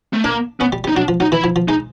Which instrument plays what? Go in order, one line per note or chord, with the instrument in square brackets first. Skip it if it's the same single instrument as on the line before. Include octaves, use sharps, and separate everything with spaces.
[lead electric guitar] A3
[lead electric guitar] A#3 [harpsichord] D4
[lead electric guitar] B3 [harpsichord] C#4
[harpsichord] G3
G3
[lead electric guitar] D#4
[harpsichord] F#3 [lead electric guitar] D4
[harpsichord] F3
[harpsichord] F#3 [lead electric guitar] D#4
[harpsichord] E3 [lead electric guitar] E4
[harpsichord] F3
F3
[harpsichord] G#3 [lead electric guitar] D#4